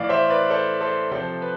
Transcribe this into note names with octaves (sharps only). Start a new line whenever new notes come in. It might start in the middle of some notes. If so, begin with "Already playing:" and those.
Already playing: A2 E3 D5 F5
C5 E5
B4 D5
A4 C5
A4 C5
C3 F3 A4 C5
B4